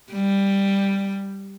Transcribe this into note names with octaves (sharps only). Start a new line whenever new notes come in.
G3